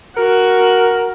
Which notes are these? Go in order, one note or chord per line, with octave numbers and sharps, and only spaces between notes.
F#4 A#4